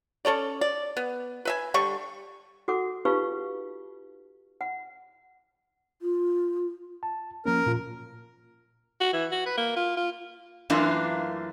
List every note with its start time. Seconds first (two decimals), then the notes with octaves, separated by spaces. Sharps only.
0.25 C#4 A4 C#5 D5
0.61 D5
0.97 B3
1.45 B4 E5 G#5
1.74 D3 G3 C#6
2.68 F#4 A4 F#5 D6
3.05 D#4 F4 G4 B4 F5 C#6
4.61 F#5
6.02 F4
7.03 A5
7.46 F3 A#3 C#4 A#4
7.66 A#2 F4 A#5
9.01 F#4
9.13 E3
9.32 F#4
9.46 B4
9.57 A#3
9.77 F4
9.97 F4
10.70 F#2 E3 A3 A#3 D4 F4